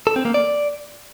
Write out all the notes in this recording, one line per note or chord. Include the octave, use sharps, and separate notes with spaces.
A4
C4
A#3
D5